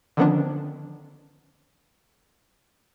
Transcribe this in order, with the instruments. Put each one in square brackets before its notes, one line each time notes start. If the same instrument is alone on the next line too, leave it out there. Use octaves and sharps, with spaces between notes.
[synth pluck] D3 D#3 F3 B3 C#4 D4